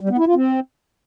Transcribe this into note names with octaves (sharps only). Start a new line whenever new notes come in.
G3
B3
E4
F4
C4